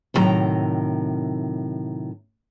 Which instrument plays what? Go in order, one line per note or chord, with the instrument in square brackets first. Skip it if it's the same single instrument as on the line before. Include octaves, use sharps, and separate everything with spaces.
[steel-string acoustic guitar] D2 A2 C3 D#3 F#3 A#5